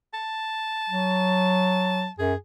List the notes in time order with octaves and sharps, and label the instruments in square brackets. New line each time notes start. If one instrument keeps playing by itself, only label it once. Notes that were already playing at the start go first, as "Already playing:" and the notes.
[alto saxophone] A5
[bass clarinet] F#3
[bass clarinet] F#2 [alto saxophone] G#4